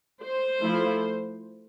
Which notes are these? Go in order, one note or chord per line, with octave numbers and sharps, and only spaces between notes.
C5
F3 A3 E4